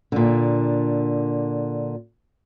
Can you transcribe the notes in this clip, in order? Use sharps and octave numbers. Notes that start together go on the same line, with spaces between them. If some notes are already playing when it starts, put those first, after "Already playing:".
A#2 D3